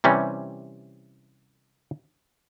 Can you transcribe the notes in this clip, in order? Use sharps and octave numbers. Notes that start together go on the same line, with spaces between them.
C3 E3 G3 C#4